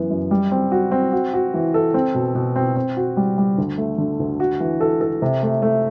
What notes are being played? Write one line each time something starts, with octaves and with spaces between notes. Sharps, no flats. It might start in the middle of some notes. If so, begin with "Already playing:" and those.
Already playing: F#2 E3 B3
F#2
G3
C4
F#4
C4
F#4
F#4
E3
A4
C4
B2
B2
C4
C4
F#4
G3
G3
D2
A3
D3
D2
F#4
E3
A4
A4
C3
A3
A3